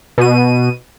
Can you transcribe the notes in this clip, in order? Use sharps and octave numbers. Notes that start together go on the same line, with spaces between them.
B2 D#7